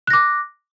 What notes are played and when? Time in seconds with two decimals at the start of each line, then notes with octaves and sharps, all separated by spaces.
0.07 F#6
0.10 A#6
0.13 D6